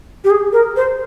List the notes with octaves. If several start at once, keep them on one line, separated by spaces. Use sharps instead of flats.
G4
G#4
A#4
C5